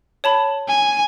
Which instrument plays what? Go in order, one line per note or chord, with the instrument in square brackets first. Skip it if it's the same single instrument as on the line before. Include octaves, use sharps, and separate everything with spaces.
[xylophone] C#5 A5 B5
[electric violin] G#5